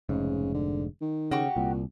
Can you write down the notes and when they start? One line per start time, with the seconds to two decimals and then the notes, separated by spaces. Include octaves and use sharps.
0.09 F1 G#2 C#3
0.54 D3
1.01 D#3
1.31 C#3 F#4 G4 C#6
1.56 C2 A#2